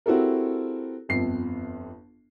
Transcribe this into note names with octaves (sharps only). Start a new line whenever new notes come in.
C4 E4 F#4 G4 A4 A#4
G1 F2 C7